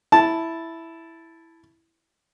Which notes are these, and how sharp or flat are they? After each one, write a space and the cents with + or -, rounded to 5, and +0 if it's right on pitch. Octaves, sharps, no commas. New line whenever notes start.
E4 +0 A5 +0